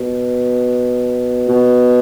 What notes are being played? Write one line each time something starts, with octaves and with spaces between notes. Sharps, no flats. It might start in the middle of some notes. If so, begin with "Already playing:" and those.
Already playing: B2
B2